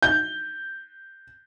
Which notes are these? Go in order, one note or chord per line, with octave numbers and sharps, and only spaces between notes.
G6